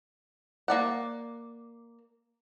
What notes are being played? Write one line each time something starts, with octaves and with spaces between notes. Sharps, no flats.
A#3 D5 F#5